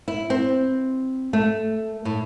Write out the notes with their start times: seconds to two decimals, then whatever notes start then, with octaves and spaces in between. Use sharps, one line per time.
0.08 E4
0.30 C4
1.33 A3
2.05 A2